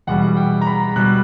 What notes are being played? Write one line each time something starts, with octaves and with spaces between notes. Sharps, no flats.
E2 B2 G3 F#5
G5
A#5
B5
B2 G3 F#6